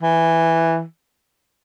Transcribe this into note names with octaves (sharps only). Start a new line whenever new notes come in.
E3